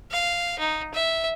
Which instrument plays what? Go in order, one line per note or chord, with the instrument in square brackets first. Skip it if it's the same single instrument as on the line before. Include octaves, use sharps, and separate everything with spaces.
[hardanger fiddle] F5
D#4
E5